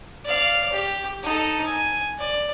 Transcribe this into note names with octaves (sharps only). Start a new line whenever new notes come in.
D5 F5
G4
D#4 A4
G#5
D5